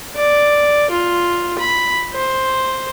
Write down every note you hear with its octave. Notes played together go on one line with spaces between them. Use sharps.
D5
F4
B5
C5